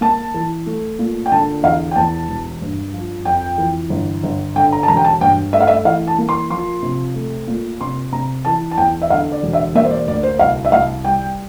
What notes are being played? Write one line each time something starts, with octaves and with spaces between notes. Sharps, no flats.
A#3 A5
E3
A3
A#2
G5
D3 A5
E2 F5
G5
E2 A5
E1
G2
F3
F2 G5
E3
G1
G1
D3 G5
A#5
A5
E1 A#5
G5
A5
G2 G5
A3 E5
F5
E5
E3 F5
A5
A#3
C6
F3 C6
C3
A3
A#2
C3 C6
C3 A#5
E3 A5
A5
E2 G5
E5
D3 F5
D5
E1
E5
A#3 E5
C5
D5
D2 D5
C5
C2 F5
E5
C2 F5
G3 G5